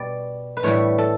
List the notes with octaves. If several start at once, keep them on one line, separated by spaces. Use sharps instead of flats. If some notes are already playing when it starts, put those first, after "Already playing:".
Already playing: B2 G3 D5
B4
A2 E3 G3 C#5
A4